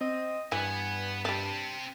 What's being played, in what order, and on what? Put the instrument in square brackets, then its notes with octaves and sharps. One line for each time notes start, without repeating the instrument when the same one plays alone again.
[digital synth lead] C4 [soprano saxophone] D#5
[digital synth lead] G2 [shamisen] E3 [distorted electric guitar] B4 F#5 [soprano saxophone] G#5
[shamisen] G3 D4 [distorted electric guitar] C4 G4 [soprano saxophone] A5